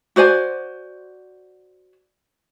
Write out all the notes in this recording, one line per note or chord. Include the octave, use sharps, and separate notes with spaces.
F#4 C5 D5 G#5